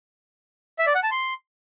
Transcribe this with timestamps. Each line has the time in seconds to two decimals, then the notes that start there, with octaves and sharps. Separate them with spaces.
0.79 E5
0.87 D5
0.95 F#5
1.03 A5
1.11 C6